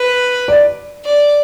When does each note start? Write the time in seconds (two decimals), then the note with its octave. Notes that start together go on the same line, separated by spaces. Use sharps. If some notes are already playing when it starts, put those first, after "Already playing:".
Already playing: B4
0.48 D5
1.05 D5